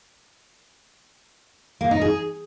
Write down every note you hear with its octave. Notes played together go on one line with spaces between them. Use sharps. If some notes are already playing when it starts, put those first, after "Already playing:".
A#3
D#4
G#4